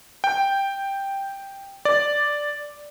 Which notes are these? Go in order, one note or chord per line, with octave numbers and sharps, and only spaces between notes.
G5
D5